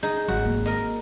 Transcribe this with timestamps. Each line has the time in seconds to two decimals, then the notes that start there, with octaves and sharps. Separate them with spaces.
0.03 D#4 G#4
0.28 G#1 F#3 F#4
0.45 A#3
0.66 A#4 D#5